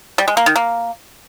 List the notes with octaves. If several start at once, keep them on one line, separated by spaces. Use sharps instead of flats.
G3
G#3
A#3
D#3
A#3